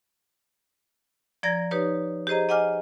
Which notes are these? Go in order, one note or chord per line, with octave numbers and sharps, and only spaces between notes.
F3 D5 A#5 G#6 A#6
D#4 G4 B4 C#5
G4 G#4 C5 D#5 A#5
D#5 F#5 G#5 D6 F6